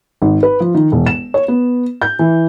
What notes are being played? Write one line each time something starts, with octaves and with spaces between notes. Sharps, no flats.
G#1
B4
F3
D#3
E1
E7
C#5
B3
G6
E3